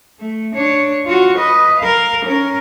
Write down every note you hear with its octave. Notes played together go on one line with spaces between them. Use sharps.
A3
D4 C#5
F4 F#4
B4 D#5
A#4 F5
C#4 A#4